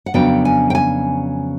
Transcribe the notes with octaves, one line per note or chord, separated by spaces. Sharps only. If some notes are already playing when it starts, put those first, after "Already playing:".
F#5
F2 C#3 F#3 B3 D4 G5
G#5
G5
G#5